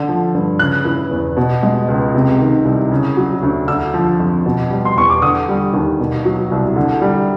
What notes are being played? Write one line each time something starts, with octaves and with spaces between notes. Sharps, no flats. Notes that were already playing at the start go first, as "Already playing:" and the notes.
Already playing: D3
F3
G2
C#3 F#6
E3
E2
B2
G#3
C#2
C3
D#3
C2
C#3
F#3
D2
D3 E6
F3
F2
B2
G3
C6
E2 C#6
D6
D3 D#6
G3
D#2
B2
F#3
C2
D3
G3